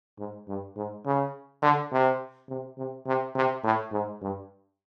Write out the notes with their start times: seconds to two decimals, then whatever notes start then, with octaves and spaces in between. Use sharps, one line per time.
0.19 G#2
0.48 G2
0.76 G#2
1.05 C#3
1.62 D3
1.92 C3
2.49 C3
2.78 C3
3.06 C3
3.35 C3
3.64 A2
3.92 G#2
4.22 G2